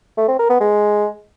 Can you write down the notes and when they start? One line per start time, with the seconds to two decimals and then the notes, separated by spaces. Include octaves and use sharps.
0.17 A3
0.28 C4
0.39 A#4
0.50 B3
0.60 G#3